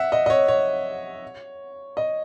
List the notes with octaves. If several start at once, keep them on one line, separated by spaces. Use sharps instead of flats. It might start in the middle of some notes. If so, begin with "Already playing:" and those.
Already playing: E5 F#5
D#5
D#5
C#5
C#5
D#5